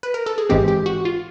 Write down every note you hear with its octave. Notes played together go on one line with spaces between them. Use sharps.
B4
A#4
A4
G#4
G#1 G#2 E3 G#3 C4 G4
G4
F#4
F4